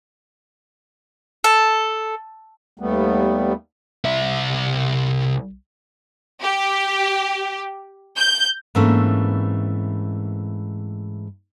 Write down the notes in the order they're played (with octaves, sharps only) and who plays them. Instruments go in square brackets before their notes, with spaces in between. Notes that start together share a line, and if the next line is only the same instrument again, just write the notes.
[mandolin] A4
[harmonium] D#2 G3 A3 B3
[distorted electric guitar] C2 E5
[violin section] G4
G6
[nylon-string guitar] G#2 E3 A3 A#3 C4 C#4